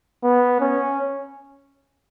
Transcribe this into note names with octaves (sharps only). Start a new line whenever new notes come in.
B3
C#4